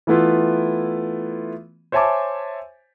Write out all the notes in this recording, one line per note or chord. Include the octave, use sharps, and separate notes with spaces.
E3 A3 B3 E4 F4
C5 C#5 E5 G#5 A5 D6